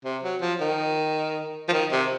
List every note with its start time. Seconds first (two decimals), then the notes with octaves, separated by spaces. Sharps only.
0.04 C3
0.23 F#3
0.41 F3
0.61 D#3
1.69 F3
1.73 D#3
1.92 C3